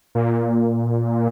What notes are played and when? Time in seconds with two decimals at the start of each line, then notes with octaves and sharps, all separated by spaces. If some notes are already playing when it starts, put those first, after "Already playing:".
0.15 A#2